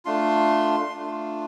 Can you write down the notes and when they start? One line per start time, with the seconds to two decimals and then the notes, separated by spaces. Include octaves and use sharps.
0.05 A3 D4 F4 C6
0.94 A3 D4 F4